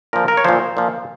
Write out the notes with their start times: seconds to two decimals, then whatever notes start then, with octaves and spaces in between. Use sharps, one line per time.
0.13 A#2 F3 A#4
0.28 A#4
0.37 C#5
0.44 A#2 F3 C5
0.77 A#2 F3